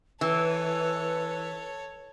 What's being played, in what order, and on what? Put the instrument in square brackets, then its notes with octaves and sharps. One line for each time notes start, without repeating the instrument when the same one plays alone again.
[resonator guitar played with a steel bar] E3 [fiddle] A4 C#5 [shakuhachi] B4